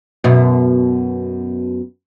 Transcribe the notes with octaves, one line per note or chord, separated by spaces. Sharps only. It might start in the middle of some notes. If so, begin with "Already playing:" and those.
F#2 B2